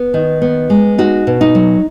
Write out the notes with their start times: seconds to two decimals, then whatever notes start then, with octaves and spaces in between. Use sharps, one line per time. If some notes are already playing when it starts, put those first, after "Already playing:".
Already playing: B3
0.14 D#3
0.42 B3
0.70 G#3
0.98 D#4 F#4
1.27 B2
1.41 D#4
1.55 F#3